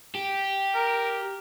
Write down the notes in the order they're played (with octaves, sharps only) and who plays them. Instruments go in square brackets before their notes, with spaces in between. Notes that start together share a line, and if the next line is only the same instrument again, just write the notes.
[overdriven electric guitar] G4
[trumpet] A#4